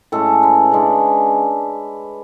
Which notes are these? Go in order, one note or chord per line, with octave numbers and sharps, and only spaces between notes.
A2 G#3 C#4 A4
B4
C#3 G#3 D4